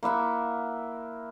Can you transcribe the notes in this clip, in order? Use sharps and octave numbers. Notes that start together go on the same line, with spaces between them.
A#3 E4 E5 F#5